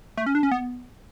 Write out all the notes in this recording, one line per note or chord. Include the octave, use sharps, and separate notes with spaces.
A3
C#4
D4
C#4
B3